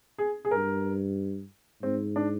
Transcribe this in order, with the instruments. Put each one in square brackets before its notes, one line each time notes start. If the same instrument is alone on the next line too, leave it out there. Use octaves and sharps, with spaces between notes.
[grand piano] G#4
G#4
[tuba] G2 [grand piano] A#4
[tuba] G#2 [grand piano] C4
[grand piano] D4